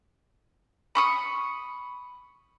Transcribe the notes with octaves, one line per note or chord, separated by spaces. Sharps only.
B5 C#6 D#6